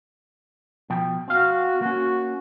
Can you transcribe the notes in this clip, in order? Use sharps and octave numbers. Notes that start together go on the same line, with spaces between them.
B2 F3 G5
C4 F#4 F5
A#3 C#4 F#4